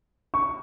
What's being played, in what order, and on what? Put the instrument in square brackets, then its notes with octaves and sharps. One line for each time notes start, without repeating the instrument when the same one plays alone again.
[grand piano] C#6